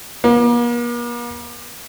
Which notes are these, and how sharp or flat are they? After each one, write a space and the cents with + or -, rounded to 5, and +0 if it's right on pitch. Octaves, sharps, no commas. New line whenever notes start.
A#3 +45